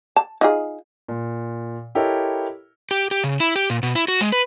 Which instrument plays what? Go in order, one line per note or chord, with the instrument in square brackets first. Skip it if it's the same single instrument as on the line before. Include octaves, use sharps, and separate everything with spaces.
[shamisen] A5
D#4 F4 G#4
[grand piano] A#2
E4 G4 A4 A#4 C#5 D#5
[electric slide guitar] G4
G4
C#3
E4
G4
A#2
B2
E4
F#4
G#3
B4